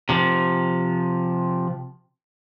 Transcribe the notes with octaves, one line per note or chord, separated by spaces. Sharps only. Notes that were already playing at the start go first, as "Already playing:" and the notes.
C3 F3